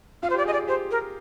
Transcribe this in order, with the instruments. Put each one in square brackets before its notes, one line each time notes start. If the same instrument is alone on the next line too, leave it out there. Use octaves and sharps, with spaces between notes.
[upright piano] F4 [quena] F5
[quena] C5
[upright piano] G4
[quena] D5
[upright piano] G#4 [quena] D#5
[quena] D5
[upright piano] G#4
[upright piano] G4 [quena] C5
[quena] A#4